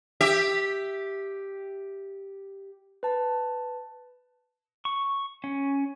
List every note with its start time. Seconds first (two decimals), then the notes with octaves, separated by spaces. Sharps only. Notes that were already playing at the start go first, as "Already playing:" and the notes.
0.21 G4 E5
3.03 B4 A5
4.85 C#6
5.44 C#4